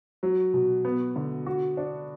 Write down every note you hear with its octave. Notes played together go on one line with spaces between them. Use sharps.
F#3
B2
B3
D3
F#4
D4